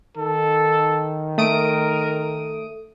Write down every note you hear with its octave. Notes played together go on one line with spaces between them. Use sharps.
D#3 A4
A3 A#4 D#6 D7